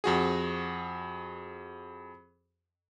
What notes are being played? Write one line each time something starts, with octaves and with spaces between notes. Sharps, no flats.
F2 F#4 G#4